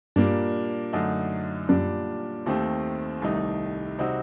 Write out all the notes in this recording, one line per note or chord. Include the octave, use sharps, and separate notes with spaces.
G2 A#2 G3 A#3 D4
F#2 D3 A3 D#4
F#2 A#2 G3 D4
D#2 D#3 A3 C4 G4
C2 C3 D#3 A3 D#4
C3 G3 C4 D#4 F#4